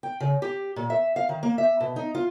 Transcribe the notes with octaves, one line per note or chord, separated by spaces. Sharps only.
G5
C#3
G4
A#2
E5
F5
D#3
A#3
E5
B2
D#4
F4